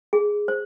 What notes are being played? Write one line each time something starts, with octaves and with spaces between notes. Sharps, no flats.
G#4
C5